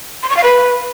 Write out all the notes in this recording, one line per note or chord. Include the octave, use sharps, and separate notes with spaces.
C6
C#6
F5
B4